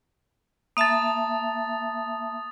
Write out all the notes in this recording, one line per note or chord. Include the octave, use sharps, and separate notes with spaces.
A#3 E5 A5 D#6 A6